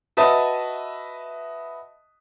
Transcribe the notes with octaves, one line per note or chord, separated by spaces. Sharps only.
F#4 B4 D#5 E5 A5 D#6